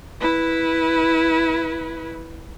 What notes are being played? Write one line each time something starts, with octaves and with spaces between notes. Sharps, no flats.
E4 B4